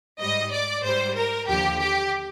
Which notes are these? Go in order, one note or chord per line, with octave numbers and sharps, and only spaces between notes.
G#2 G3 D#5
D5
G#2 G3 C5
A#4
D#2 D3 F3 G4
G4